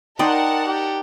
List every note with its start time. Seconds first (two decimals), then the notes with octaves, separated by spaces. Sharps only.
0.19 D#4 A#4 D5 F#5 G5 A5 C6 D#6
0.67 G4